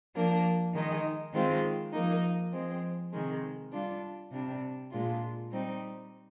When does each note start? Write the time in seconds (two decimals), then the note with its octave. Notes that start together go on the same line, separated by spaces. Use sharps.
0.15 F3 A#3 D4
0.74 D#3 G#3 D#4
1.33 D#3 G#3 C4 F4
1.93 F3 A#3 D#4
2.52 F3 G#3 C4
3.12 C3 D#3 G#3
3.73 G3 D4 F4
4.31 C3 G3 D4
4.91 A#2 G#3 D4 F4
5.51 G3 C4 D#4